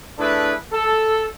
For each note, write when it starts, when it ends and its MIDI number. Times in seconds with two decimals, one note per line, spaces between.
0.19 0.53 57
0.19 0.53 62
0.19 0.53 64
0.19 0.53 68
0.19 0.53 71
0.73 1.25 69